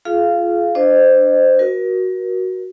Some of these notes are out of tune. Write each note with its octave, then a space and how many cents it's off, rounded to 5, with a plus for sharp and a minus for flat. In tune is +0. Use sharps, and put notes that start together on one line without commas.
F4 -15 G#4 +35 F5 -10
D4 +0 C5 -5 D#5 -25
F#4 +5 A#4 +30